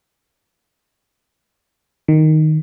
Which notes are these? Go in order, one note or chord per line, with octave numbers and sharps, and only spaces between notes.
D#3